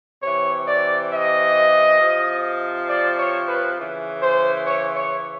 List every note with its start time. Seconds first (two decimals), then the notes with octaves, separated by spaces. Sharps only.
0.23 C3 E3 C#5
0.68 D5
1.12 D#5
2.01 C3 F3
2.89 D5
3.19 C#5
3.49 B4
3.78 C#3 E3
4.22 C5
4.67 C#5
4.96 C#5